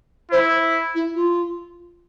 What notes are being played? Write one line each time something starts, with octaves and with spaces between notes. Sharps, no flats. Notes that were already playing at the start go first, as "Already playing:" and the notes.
E4 C5
E4
F4